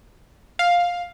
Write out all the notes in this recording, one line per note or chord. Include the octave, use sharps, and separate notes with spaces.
F5